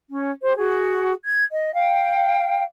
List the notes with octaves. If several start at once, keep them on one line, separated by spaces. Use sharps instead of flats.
C#4
G4 C5
F#4 G#4
G#6
D#5
F5 G5